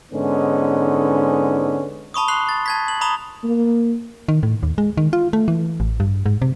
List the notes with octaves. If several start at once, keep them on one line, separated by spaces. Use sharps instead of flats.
G#2 D3 B3 C#4 D#4
A5 B5 C#6 D#6
C6 F#6 C7 F7 G7
A6
A5 G#6 B6
F#7
A#5 B5 D#6 F7 G7
A#3
D#3
A2
D#2
G#3
D#3
F4
A3
E3
A1
G2
G#2
C3